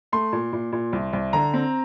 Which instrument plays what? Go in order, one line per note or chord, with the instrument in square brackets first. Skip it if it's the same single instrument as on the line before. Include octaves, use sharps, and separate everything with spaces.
[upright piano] A3 C6
A#2
A#2
A#2
C2
C2
D3 A#5
C4